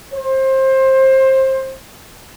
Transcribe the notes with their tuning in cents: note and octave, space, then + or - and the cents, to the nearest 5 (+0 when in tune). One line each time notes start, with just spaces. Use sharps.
C5 +25